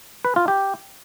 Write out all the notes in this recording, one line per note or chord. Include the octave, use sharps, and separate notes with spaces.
B4
F4
G4